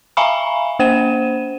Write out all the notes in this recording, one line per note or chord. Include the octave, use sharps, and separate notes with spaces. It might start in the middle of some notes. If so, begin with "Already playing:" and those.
E5 F5 G#5 A#5 B5 C#6
A#3 C5 D#7 E7